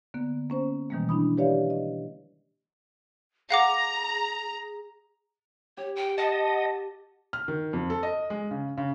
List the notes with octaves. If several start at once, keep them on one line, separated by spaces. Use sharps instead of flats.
D3 A#3 B3
A#3 C#4 C5
B2 D#3 E3 G3 G#3 A#3
D4 E4 B5 D#6
G4 B4 C#5 D5 E5 F5
D#5
G#4 F5 F#5 A#5 D6
G4 C#5
G5
D#5 F#5 A5
F6
D#3
F2
A4
D#5
G#3
C#3
C#3